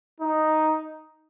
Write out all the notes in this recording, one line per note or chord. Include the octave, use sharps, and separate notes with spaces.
D#4